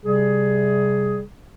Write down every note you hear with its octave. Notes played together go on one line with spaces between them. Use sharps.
C3 G3 G#4